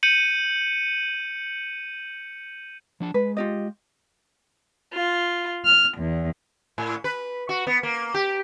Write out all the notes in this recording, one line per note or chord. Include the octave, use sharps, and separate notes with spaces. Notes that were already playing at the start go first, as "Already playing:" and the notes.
G6 C#7 D#7 F#7
F3 D4 A5
G#3 B4
F4 G4 D#5
F4
F6
E2
A2
B4
F#4
B3
A#3
G4